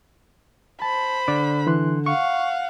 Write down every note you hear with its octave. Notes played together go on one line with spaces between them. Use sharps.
C5 A5 B5
D3 D5
E3 C6 F#6
F5 F#5 C#6